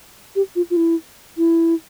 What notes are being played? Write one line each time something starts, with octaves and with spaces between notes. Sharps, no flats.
G4
F4
F4
E4
E4